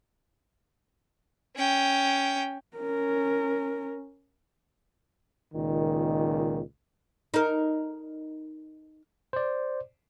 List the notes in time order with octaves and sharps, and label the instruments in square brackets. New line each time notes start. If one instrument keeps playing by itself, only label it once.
[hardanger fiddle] C#4 G5
[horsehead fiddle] C#4 A#4
[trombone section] C#2 A#2 D#3
[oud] D#4 A#4
[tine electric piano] C5 D5